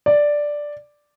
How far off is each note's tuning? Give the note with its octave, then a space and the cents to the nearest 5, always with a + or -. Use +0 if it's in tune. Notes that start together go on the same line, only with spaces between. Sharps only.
D5 +0